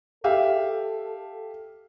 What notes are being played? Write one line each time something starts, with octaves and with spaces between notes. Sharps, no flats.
G4 A4 E5 F5